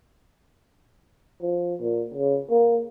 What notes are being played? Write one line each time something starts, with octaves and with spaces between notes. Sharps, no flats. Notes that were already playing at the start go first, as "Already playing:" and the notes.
F3
A#2
C#3
A#3